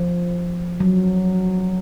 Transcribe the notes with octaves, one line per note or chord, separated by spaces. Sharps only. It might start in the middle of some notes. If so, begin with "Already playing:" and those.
Already playing: F3
F#3